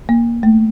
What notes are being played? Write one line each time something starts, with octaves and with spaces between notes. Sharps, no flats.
A#3
A3